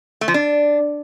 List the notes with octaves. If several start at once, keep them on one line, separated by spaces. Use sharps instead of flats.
A3
F3
D4